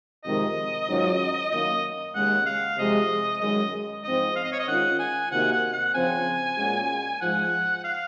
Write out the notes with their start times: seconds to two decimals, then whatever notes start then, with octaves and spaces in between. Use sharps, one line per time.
0.24 F2 C3 D#3 G#3 D#5
0.88 G#2 D#3 F#3 C#4 F4
1.51 F#2 D#3 A#3 D#5
2.15 D#2 C#3 G#3 F#5
2.46 F5
2.78 C3 F3 G#3 D#5
3.41 F#2 D#3 G#3 D#5
4.04 G#2 F3 C4 D#5
4.36 F5
4.44 D#5
4.52 C#5
4.59 D#5
4.68 D#3 G#3 C#4 F4 F#5
4.99 G#5
5.31 C3 D#3 A#3 D#4 F#4 F#5
5.52 F#5
5.73 F#5
5.94 C#3 F3 C4 G#5
6.58 A#2 G#3 C#4 F#4
7.21 G#2 F3 G#3 F#5
7.84 F5